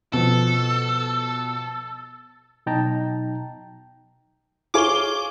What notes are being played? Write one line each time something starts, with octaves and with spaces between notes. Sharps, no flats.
B2 F3 A4
B2 F#3 D#4 G5 A5 A#5
F4 G#4 C#5 D6 G7